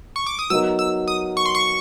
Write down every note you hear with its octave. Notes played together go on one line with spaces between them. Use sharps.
C#6
D6
D#6
F#3 B3 D#4 F#4 A#4 E6
E6
D#6
C#6
C6
C#6